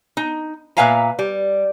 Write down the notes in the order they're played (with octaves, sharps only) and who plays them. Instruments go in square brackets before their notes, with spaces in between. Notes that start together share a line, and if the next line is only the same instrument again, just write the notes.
[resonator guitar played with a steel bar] D#4
A#2 B4 E5 F5 G#5 A#5
G3